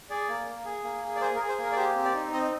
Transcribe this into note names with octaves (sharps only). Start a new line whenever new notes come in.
G#4 D5
A#3
A#3
G#4
A#3
G#4
D5
G#4 C5
A#4
G#4
C5
A#3 A#4
D5
G4 C5
C4
D5
D#4
C4 D#5